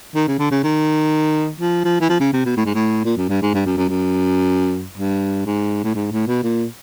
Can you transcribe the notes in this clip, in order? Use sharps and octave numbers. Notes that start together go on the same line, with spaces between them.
D#3
C#3
D3
C#3
D#3
F3
F3
E3
F3
C#3
C3
B2
A2
G#2
A2
A#2
F#2
G2
G#2
G2
F#2
F#2
F#2
G2
G#2
A2
G#2
A2
B2
A#2